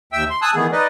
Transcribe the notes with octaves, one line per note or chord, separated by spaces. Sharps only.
D#2 E5 G5 E6
C6
G#5 A5 D#6 E6 F#6
D#3 E3 A3 B3 G#4
D#4 B4 D5 D#5